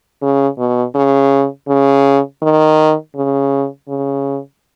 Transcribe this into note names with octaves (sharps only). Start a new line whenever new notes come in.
C#3
B2
C#3
C#3
D#3
C#3
C#3